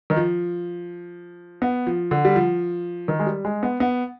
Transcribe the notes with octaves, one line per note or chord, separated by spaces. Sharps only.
D#3
F3
B3
F3
D3
G3
F3
D#3
G#3
G3
G#3
B3
B3